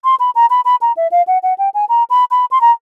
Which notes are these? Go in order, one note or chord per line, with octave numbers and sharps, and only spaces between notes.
C6
B5
A#5
B5
B5
A#5
E5
F5
F#5
F#5
G5
G#5
A#5
B5
B5
C6
A#5